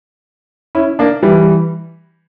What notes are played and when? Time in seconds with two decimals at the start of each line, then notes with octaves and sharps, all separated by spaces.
0.75 C#4 E4
0.99 A#3 D4
1.23 E3 G3